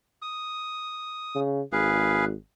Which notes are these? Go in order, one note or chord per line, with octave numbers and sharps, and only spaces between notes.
D#6
C#3
G#1 G#4 B4 F5